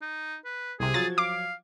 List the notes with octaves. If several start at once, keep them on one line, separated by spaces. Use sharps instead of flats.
D#4
B4
C2 C3 G#4
F3 F#3 G#6 A6
F5 D6